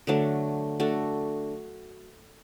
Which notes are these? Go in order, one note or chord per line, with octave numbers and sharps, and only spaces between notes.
D3 F#3 A3 D4
A3 D4 F#4 A4